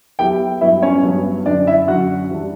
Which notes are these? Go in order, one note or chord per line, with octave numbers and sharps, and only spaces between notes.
F#3 B3 E4 G4 A4 G5
G2 F#3 B3 E4 F#4 E5
C#4 C#5
G2 F#3 B3 F#4
F#2 D3 F#3 D4 D5
E4 E5
F#2 D3 F#3 F#4 F#5
E3 G3 D4